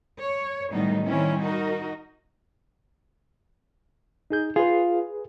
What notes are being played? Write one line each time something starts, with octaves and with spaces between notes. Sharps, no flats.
C#5
A2 D#3 F#3 G3 B3 D#4
D#3 G3 C4 C#4 E4
D#4 F#4 A#4
D#4 G#4 G6
F4 G#4 B4